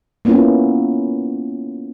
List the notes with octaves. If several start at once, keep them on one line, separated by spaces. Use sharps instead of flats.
A#3 B3 C#4 E4 F4